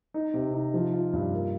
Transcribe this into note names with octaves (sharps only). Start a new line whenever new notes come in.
D#4
C3
D#4
F3
F4
G2
A#3